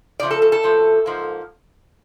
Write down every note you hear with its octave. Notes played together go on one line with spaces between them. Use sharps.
C#3 F3 A3 D5
A4
A4
A4
A2 F3 A3
G#2 F3 A#3